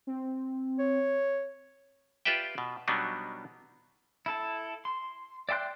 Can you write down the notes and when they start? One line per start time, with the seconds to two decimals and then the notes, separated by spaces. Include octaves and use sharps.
0.07 C4
0.79 C#5
2.25 F4 G4 B4 D5 E5 G5
2.58 B2
2.88 B2 F#3 G3 B3 D4 D#4
4.26 E4 A4
4.85 C6
5.49 D5 E5 G5 C6 F#6